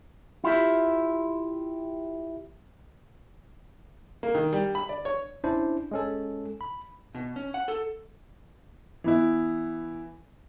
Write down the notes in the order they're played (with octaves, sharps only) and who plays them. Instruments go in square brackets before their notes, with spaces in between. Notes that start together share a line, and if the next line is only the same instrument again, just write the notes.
[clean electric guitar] E4 F4 G4 E5
[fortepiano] A#3
D#3
G3
B5
D5
C#5
[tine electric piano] C#4 D4 E4 C5
G#3 C#4 A4
B5
[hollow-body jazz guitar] B2
C#4
F#5
A4
[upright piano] E3 B3 E4